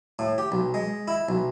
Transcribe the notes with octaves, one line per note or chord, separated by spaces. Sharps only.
A2
G4
B1
G#3
E4
B1